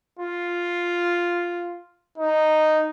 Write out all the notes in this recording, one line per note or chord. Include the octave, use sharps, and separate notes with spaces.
F4
D#4